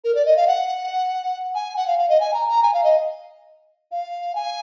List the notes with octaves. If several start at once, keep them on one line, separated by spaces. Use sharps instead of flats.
A#4
D5
D#5
F5
F#5
G#5
F#5
F5
F5
D#5
G#5
A#5
A#5
G#5
F5
D#5
F5
G#5